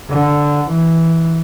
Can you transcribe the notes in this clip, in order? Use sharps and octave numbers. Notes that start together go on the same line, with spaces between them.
D3
E3